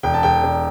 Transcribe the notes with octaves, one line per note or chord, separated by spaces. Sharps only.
E1 G5
A5
E1 G5
E1